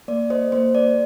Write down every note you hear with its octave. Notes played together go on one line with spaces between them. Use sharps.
A#3 D5
A4 C5 D#5
A#3 C5
A4 D5